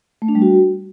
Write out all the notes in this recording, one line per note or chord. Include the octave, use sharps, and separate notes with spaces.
A3
D4
G3
F#4